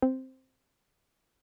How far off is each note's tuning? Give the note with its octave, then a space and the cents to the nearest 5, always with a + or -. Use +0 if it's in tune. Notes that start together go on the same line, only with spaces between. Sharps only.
C4 +0